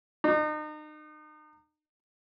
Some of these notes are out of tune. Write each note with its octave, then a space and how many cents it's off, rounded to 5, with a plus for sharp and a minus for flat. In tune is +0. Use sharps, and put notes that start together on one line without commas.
D#4 -35